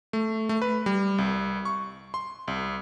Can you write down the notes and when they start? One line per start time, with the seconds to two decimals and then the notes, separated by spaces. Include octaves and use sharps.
0.13 A3
0.49 A3
0.62 B4
0.86 G3
1.18 C2
1.65 C#6
2.14 C6
2.48 C2